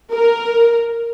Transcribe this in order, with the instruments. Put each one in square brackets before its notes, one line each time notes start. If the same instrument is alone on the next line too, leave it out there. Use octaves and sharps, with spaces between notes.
[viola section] A#4